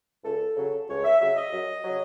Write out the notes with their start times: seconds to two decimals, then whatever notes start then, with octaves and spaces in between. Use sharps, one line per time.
0.24 C#2 A4
0.57 C#3 F#3
0.89 C#2 C#5
1.04 E5
1.20 C#3 F#3 E5
1.36 D#5
1.52 F#2
1.84 C#3 F#3